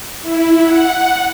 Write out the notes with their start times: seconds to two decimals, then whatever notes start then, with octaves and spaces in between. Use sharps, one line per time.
0.22 E4
0.62 F#5